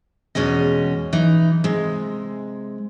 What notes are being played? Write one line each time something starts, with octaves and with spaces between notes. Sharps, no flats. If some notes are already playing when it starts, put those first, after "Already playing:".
E2 B2 G#3 C#4 D#5
E3 D#4
C3 G#3